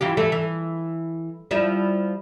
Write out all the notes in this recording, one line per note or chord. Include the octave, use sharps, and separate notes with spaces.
E3 F4 G4
E3 A3
E3
F3 G3 E4